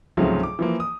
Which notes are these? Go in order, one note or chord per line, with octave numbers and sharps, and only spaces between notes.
C#2 G#2 C3 F3 F#3 A3
D6
E3 F3 A#3
D#6